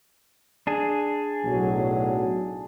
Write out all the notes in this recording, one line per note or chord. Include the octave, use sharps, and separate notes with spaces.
D4 G#4
B1 A2 F#3